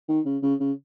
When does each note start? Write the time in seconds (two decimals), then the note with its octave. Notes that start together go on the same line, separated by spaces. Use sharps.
0.09 D#3
0.26 C#3
0.43 C#3
0.60 C#3